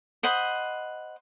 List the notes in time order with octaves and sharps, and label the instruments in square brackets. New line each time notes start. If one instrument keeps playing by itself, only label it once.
[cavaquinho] C5 D#5 F#5 B5